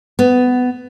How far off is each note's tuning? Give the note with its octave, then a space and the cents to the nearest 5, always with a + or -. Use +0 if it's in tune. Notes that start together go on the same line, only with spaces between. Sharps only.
B3 +15